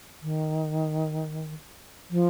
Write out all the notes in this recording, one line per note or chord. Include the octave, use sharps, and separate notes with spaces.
D#3
F3